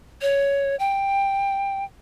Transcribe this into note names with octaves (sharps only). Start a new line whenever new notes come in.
C#5
G5